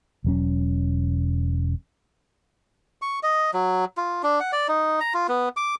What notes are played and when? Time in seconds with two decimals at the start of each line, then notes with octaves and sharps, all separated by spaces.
0.24 E1 F#3 C#4
3.02 C#6
3.23 D#5
3.54 F#3
3.97 F4
4.23 D4
4.40 F#5
4.52 D5
4.68 D#4
5.01 A#5
5.14 F4
5.29 B3
5.57 D6